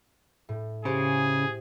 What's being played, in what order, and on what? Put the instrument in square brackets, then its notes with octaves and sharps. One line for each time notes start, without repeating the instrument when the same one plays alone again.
[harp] A2
[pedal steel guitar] C#3 [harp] G4 C5 [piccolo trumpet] G#4